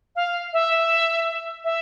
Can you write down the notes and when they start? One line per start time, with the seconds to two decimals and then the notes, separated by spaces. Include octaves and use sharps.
0.16 F5
0.53 E5
1.64 E5